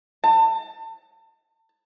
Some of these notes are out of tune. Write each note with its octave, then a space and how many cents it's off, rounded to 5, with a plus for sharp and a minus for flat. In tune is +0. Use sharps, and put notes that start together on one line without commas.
A5 +35